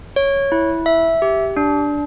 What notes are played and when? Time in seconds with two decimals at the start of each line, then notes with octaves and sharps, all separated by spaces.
0.16 C#5
0.52 E4
0.86 E5
1.22 G4
1.57 D4